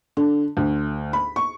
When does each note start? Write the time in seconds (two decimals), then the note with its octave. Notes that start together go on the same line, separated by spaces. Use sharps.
0.17 D3
0.57 D2
1.13 B5
1.36 C#6